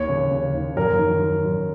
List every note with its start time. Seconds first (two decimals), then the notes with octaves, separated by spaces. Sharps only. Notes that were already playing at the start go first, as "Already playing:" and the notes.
Already playing: D#2 C#5
0.09 C#3
0.31 C#3
0.53 D#2
0.76 F#2 A#4
0.99 D#3
1.22 D#3
1.45 F#2